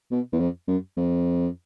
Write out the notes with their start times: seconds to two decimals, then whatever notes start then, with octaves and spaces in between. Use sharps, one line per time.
0.11 B2
0.33 E2
0.40 F2
0.68 F#2
0.97 F2